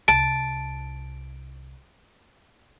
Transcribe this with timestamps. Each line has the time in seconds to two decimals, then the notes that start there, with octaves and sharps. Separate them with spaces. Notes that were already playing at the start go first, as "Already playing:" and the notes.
0.08 C2 A5 D7